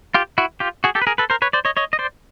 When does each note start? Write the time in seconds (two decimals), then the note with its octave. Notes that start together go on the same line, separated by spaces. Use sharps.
0.15 F4 G4
0.38 E4 F#4
0.60 F4 G4
0.84 F#4 G#4
0.95 G4 A4
1.02 B4
1.07 G#4 A#4
1.18 A4 B4
1.30 A#4 C5
1.42 B4 C#5
1.53 C5 D5
1.65 C#5 D#5
1.77 C#5 D#5
1.93 D#5
1.99 C5 D5